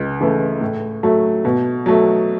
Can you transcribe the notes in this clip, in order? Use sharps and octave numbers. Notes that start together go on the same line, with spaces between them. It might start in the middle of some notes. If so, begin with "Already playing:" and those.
Already playing: C#2
C#3 E3 A3
A2
F#3 A3
B2
F#3 A3